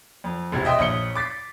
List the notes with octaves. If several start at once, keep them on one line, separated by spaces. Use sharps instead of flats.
F2
E1 A1 C3 G#6
D#5 E5 G5 C6 D#6
A#1 C#5 D#6 C#7 G7
D6 A6 B6 C7